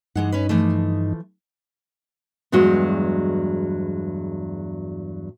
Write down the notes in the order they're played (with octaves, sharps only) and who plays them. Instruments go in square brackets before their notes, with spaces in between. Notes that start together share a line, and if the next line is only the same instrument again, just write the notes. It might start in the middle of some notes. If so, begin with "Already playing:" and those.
[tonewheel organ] G2 D#4 [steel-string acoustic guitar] E3 G#3 F#5
[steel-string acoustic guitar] C#4 B4
E3 F3 A3
[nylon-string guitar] E2 G2 F#3 G#3 F#4